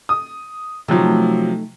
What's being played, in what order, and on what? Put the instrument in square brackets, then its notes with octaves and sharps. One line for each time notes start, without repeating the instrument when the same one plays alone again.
[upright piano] D#6
[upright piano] C3 F3 F#3 [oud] A3 D#4